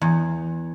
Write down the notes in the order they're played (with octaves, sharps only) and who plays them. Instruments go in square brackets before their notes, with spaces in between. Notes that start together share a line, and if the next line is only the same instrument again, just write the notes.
[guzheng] E2